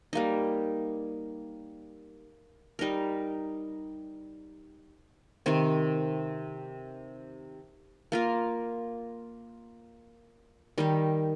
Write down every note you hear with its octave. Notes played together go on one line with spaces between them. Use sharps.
G3 A#3 D#4
G3 D#4 A#4
C3 D#3 C4
A#3 F4 A#4
D#3 G3 D#4 G4